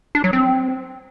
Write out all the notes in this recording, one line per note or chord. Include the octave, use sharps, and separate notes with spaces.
D4
F#3
C4